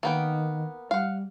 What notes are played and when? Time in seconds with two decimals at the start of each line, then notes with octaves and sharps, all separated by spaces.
0.03 D#3 A#3 B3 G5
0.91 G3 F5 F#5